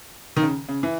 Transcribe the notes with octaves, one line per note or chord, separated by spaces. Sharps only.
D#3
C#3
C#3
E3